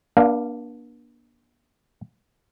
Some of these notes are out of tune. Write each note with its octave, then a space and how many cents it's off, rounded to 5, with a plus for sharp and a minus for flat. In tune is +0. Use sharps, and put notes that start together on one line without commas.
A#3 +45 D4 +0 F5 -10